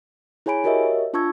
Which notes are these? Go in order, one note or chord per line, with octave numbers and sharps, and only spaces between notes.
E4 G#4 C#5 G#5 B5 D7
F#4 G4 A#4 C#5 D#5 E5
D4 F4 A5 C#6 E6 G#6